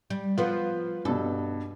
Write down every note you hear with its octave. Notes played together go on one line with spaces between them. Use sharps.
G3
F3 B3 F4 B4
G2 B2 A4